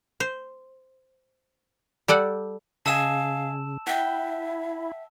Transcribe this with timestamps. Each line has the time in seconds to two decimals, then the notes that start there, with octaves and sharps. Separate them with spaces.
0.20 C5
2.08 G3 A4 D5 F#5
2.86 C#3 D#5 F5 G#5 A5 E6 E7
3.87 E4 E5 F#5 G5